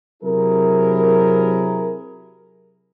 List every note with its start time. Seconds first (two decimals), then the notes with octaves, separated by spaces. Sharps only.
0.23 C3 F#3 E4 G#4 A#4